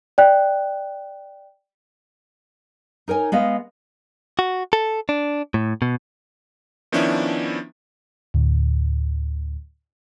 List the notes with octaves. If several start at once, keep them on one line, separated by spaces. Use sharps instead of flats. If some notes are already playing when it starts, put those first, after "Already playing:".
D5 G5 F#6
D#4 A#4 C#5 G#5
G#3 B3 D#5 F5
F#4
A4
D4
A2
B2
D#3 F3 B3 C#4 D4 E4
D2 A2